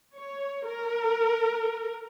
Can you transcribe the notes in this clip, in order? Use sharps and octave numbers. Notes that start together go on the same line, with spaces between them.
C#5
A#4